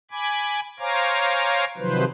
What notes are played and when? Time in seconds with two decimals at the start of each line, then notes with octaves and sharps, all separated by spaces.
0.11 G#5 B5 D6 G#6
0.79 C5 C#5 F5 G#5 A#5 D6
1.77 C3 D#3 F3 F#3 B4 C5